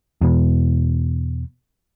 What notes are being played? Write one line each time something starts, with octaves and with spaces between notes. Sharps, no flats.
E2 B2